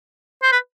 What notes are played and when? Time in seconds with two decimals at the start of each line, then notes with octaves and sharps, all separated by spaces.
0.42 C5
0.52 B4